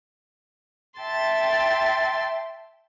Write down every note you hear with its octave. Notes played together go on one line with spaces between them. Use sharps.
E5 G5 A5 C6 A6